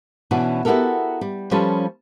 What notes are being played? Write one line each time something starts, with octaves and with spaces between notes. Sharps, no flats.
B2 E3 C#4 D4 F#4
B3 E4 F#4 G4 A4 A#4
G3
F3 G3 C#4 F4 A4 B4